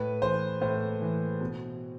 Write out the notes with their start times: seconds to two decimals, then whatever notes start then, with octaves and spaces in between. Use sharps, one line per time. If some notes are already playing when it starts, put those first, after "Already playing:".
Already playing: A2 B4
0.22 E3 C5
0.62 A2 C5
1.02 E3
1.41 B2